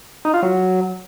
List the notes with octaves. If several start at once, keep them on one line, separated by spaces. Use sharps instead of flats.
D#4
F4
F#3